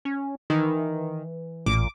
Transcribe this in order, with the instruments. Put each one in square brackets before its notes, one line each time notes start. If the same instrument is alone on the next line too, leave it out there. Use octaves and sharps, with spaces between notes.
[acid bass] C#4
[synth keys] D#3 [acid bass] E3
[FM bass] A1 [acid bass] A#2 [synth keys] D6